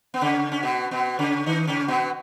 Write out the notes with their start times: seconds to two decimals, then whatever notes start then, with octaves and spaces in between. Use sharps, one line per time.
0.14 B3
0.21 C#3 C#4
0.52 C#4
0.63 B2 B3
0.91 B2 B3
1.19 C#3 C#4
1.46 D#3 D#4
1.67 C#3 C#4
1.88 B2 B3